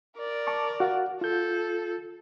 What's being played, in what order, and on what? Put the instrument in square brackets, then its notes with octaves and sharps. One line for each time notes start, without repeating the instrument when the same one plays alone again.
[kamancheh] A#4 D5
[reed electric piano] A5 C#6 D6
F#4 F5 F#5
[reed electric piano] F4 G6 [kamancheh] A4